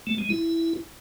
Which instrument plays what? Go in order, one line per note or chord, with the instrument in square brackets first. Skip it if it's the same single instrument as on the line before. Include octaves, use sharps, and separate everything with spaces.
[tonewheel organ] A3
G#3
E4